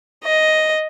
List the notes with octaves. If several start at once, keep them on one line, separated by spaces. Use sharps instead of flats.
D#5